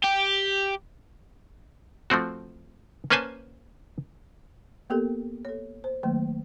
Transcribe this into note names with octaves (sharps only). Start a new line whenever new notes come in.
G4
F3 A3 C4 F#4
A#3 C#4 B4 C5 G#5 A5
A#3 B3 G4 A4 A#4
A4 C#5
C5
D#3 F#3 A3 A#3